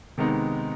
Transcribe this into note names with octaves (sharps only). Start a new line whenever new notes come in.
C3 D#3 G#3 B3 D#4